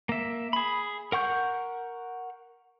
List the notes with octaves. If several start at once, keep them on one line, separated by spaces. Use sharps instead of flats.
A#3 E5
G#4 B5
A#4 F#5 C#6 G6